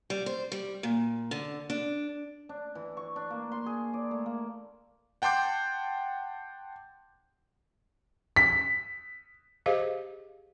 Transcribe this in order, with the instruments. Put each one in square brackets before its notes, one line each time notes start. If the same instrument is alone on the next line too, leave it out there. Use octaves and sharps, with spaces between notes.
[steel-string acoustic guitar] G3
C5
G3
A#2
D3
D4
[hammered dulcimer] D4
E3
C#6
D4
A#3
C6
G#4
D5
A3
A#3
[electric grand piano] F#5 G5 A5 C6 D6 G6
[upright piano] B6
[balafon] G4 G#4 C5 D#5 F5